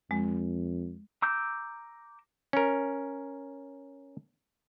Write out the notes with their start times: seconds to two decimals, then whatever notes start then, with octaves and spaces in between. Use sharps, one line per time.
0.11 F2 G#3
1.22 A#5 D6 E6 G6
2.53 C#4 A#4